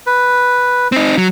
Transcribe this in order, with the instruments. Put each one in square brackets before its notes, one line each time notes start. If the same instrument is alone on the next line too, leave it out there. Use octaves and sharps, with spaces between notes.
[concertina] B4
[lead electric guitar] C4 D#4
F#3